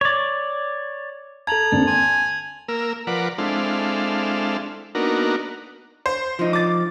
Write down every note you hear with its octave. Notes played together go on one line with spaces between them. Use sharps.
C#5 D5
A4 A5 A#5 G#6 F7 F#7
D#2 D3 C4 A5
G#5 C6
A#3 A#4 E6
F3 A#4 B4 D5 F#5
G#3 C4 D4 E4 A4 F5
A#3 B3 D4 D#4 F#4 A#4
C5
F3 D#4
D6 A6